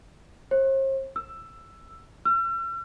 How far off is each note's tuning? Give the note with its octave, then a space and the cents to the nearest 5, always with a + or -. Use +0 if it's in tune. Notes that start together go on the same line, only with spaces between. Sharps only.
C5 +45
E6 +10
E6 +45